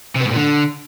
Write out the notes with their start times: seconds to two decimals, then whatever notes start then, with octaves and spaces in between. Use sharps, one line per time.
0.15 C3
0.20 B3
0.25 G#2
0.31 A#2
0.36 D3